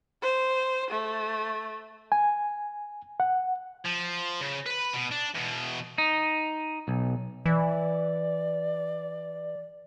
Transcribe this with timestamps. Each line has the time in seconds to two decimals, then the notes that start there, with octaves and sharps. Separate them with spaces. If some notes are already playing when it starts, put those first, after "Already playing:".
0.22 C5
0.91 A3
2.12 G#5
3.20 F#5
3.86 F3
4.41 C#3
4.66 B4 B5
4.94 B2
5.12 D4
5.35 E2 B2
5.98 D#4
6.88 B1
7.46 E3 D5